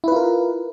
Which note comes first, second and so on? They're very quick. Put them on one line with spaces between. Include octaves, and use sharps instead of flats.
E4 B4 F4 A#4